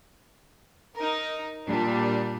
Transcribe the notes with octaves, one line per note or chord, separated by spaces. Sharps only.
D#4 A#4
A#2 G3 D4